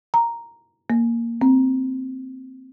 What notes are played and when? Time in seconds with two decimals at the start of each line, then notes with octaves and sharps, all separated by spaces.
0.14 A#5
0.90 A#3
1.41 C4